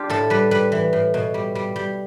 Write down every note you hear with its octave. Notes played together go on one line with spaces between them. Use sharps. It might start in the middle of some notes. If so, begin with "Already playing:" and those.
Already playing: D4 F4 G4
A2 A4
G3 B4
G3 B4
E3
A2
B2
G3
G3
G3